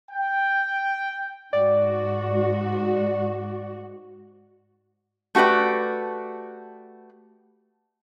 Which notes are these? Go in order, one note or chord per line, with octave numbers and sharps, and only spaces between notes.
G5
G#2 F#4 D5
A3 F#4 G4 B4 D5